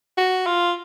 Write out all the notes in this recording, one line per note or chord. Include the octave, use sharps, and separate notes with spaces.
F#4
F4